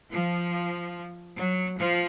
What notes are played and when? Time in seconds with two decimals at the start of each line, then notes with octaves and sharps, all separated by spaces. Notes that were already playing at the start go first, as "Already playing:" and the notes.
0.12 F3
1.37 F#3
1.78 F3